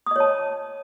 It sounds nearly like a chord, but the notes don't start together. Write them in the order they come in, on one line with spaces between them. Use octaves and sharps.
D#6 D#5 C#5 A5